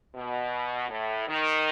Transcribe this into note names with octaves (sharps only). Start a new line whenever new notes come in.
B2
A2
D#3